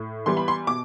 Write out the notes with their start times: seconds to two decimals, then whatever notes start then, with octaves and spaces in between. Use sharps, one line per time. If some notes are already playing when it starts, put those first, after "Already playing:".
Already playing: A2
0.26 E3 G3 B3 C6
0.37 B5
0.48 C6
0.67 B2 D6